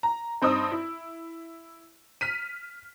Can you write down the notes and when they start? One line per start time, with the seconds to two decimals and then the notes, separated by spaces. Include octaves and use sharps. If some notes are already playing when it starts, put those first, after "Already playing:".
0.03 A#5
0.42 G2 C4 D#4 D#6 E6
0.72 E4
2.21 F6 B6 D#7